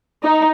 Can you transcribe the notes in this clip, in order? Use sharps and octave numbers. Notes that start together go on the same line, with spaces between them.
D#4